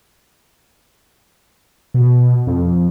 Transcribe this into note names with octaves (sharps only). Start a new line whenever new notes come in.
B2
F2